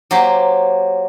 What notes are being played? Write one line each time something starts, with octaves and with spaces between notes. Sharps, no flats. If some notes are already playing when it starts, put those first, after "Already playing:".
F#3 A#3 G4 C5